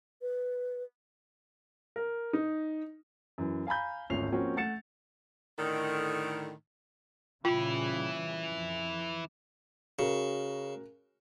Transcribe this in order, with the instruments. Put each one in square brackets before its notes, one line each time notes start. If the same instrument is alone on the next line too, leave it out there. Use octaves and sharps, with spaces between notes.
[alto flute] B4
[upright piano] A#4
D#4
[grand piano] F#2 E3
F5 G#5 A#5 B5 G6
G#1 D2 C#4 F4 C7 F7
F3 A#3 C4 C#4 F#4
A3 F#5 A6 C#7 E7
[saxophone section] A2 D3 D#3
[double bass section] A#2 C#3 G3 [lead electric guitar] E3 E4 [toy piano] F4 G5
[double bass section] F2
[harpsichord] C#3 [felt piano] C#4 F#4 A#4